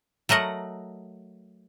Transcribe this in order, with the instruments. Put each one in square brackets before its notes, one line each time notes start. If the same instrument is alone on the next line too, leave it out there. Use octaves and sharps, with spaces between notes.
[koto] F#3 A3 A#4 D#5 F#5